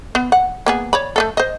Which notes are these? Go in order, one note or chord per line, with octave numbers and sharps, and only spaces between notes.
B3
F#5
A#3 B3 G#4
C#5 D5 B5
A3 B3 A4
C5 D#5